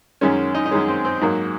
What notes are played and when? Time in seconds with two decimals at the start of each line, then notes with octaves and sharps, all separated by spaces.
0.21 F#2 D#3 G#3 C#4
0.54 D#4
0.66 D#4
0.71 F#2 D#3 G#3 C#4
0.88 C4
1.05 C4
1.21 G#2 F#3 A#3